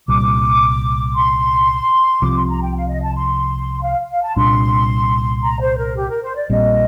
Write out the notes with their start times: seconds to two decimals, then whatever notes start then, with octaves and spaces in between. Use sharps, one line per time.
0.08 C2 A#2 G3 D6
1.15 C6
2.22 C2 C3 F3 C4 D6
2.35 C6
2.49 A#5
2.62 G5
2.75 F5
2.89 D#5
3.02 A5
3.15 C6
3.82 F5
4.09 F5
4.23 A5
4.36 C2 A#2 G3 D4 C6
5.43 A#5
5.61 C5
5.79 A#4
5.97 G4
6.10 A#4
6.23 C5
6.36 D5
6.49 A#1 A#2 G3 C4 D#5